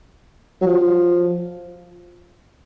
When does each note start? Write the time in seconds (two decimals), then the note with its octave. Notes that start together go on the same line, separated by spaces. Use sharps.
0.61 F#3
0.66 F3